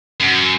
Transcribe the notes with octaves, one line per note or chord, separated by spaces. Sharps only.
F#2